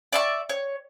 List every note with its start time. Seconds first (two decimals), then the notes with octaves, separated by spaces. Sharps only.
0.12 D5 E5 C#6
0.49 C#5